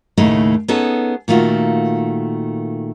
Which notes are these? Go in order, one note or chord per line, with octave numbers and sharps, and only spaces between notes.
D#2 A2 C#3 A3 D#4
B3 C#4 D#4 G#4 A4
A#2 D#3 A3 F4 F#4